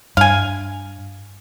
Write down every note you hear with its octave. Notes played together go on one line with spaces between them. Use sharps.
G2 F5 G#5